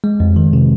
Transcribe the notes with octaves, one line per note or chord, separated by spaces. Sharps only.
G#3
F2
D#3
C3